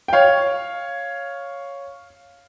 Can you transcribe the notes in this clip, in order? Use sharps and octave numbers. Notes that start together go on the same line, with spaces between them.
G5
C#5 F5